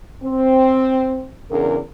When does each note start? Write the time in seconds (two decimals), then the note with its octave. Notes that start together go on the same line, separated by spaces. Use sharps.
0.23 C4
1.51 E2 C#3 D4 A#4